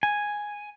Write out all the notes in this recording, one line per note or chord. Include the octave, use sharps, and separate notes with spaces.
G#5